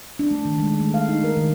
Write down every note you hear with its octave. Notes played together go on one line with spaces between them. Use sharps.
D4
A3
D#3
G#3
A3
F5
D#4
A#4
D#3